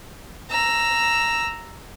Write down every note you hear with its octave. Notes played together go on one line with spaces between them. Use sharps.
A#5 E6